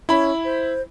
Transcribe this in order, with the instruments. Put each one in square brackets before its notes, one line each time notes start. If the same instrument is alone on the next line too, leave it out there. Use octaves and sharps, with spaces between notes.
[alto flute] C#4 [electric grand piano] E4 B5
[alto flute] C5